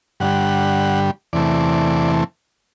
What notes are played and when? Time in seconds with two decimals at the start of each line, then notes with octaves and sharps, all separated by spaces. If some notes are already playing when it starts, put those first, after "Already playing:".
0.20 G2 D3 G3 F#5
1.33 E2 C3 E3 A3 D5